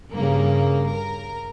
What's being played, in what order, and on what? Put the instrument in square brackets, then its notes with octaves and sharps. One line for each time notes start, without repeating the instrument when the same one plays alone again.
[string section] G2 A#3 [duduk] C#3
[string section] A#4